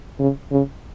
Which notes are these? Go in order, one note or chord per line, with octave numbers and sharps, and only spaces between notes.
C#3
C#3